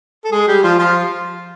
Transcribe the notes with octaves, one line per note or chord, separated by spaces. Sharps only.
A4
G#3 G#4
G3 G4
F3 F4
F3 F4